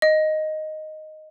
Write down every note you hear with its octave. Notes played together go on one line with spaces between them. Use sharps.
D#5